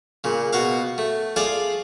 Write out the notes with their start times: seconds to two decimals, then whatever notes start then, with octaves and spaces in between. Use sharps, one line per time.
0.24 A#2 C#3
0.53 B2 F#4 F5
0.98 A3
1.36 F4 G#4 A4 D5 F5